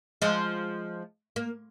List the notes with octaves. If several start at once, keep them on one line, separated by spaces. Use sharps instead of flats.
F3 G#3
A#3